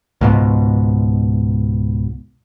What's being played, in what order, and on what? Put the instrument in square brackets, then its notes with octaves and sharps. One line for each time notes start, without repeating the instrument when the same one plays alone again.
[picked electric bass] C#2 G#2 B2